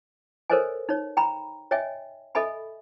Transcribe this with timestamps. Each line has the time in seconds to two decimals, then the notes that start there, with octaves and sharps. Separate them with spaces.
0.50 A4 A#4 C5 C#5 D#5 G#5
0.89 D#4 C#5
1.17 G5 A#5 B5
1.71 C#5 D#5 E5 G5 G#5
2.35 A4 D#5 E5 G#5 B5